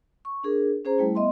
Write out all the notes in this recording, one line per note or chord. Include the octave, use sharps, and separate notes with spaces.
C#6
D4 G#4 A#4
C#4 G#4 C5 A#5
G3 A3 E4
B3 D#5 E5 C6